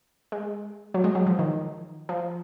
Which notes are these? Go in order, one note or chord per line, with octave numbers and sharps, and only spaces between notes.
G#3
F#3
G#3
F#3
F3
D#3
F3